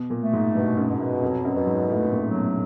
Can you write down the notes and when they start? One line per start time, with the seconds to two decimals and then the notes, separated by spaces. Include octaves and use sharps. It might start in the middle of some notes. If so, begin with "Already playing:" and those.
Already playing: B2
0.10 A#2
0.21 A3
0.33 G#2
0.55 G2 B2
0.78 F#2
0.89 B2
1.00 F#2
1.22 F2 F#3
1.45 F#2
1.55 B2
1.67 G#2
1.89 A2 A3
2.07 A2
2.12 A#2
2.23 F#3
2.34 B2